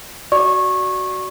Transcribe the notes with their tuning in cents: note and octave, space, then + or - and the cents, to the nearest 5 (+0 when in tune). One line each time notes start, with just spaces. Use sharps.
F#4 +10 D5 +0 C#6 -20